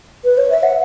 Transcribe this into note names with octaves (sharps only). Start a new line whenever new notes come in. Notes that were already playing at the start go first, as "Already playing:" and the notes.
B4
C#5
E5
F#5